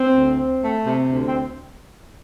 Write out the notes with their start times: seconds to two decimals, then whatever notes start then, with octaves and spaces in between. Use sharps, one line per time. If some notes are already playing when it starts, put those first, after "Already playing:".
Already playing: C4
0.10 D2
0.36 C4
0.61 A3
0.85 C3
1.09 D2
1.28 C4